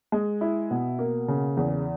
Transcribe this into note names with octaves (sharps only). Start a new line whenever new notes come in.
G#3
E4
B2
A#3
C#3
E2